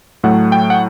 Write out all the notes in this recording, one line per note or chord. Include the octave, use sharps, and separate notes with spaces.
A2 F#3 A3 F#5
G5
F#5